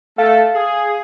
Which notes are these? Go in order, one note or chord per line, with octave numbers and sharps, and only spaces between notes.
A3 A4 F5
G#4